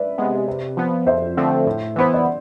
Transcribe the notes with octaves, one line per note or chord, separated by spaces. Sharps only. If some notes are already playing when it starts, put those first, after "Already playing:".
Already playing: B4 D5 E5
C3 G#3 B3
C3
F3 B3
F2 C5 E5
D3 F3 A3 C4
A2
E3 B3 E4 C5
D5